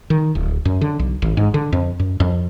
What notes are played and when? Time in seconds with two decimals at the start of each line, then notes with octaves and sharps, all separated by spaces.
0.10 D#3
0.35 D1
0.65 F#2
0.81 D3
0.99 B1
1.22 G#1
1.37 G#2
1.54 D3
1.72 F2
1.99 F#2
2.20 F2